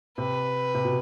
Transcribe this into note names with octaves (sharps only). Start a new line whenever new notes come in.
C3 B4
C3
B2